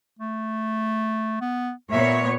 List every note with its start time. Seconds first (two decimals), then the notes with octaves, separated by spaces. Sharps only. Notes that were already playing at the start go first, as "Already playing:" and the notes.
0.19 A3
1.41 B3
1.92 A#2 B3 C#5 E5